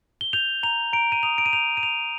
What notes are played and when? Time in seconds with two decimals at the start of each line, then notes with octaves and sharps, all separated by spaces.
0.21 G7
0.33 G6 F7
0.63 A#5 F7
0.93 A#5 D7
1.12 D#7
1.23 D#6 F7
1.38 D7
1.46 D#7
1.53 G6 F7
1.77 D#7
1.83 A#5 F7